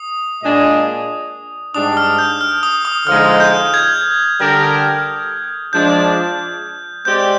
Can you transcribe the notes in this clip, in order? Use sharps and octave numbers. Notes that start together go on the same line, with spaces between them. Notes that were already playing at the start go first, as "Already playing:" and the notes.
Already playing: D#6
A#2 G#3 D4 G#4 D#5
G#2 G3 D4 D#6
F6
G6
F6
D#6
D#6
D3 F3 G#3 D#4 F6
G6
G#6
D3 G3 D4 G4 A#4
F3 G#3 D4 G6
G#3 C4 G4 D5 G6